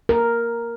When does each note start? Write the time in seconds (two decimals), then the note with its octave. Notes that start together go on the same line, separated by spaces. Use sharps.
0.09 A#4